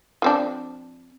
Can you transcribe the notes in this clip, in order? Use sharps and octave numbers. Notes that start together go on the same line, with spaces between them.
F3 C4 D4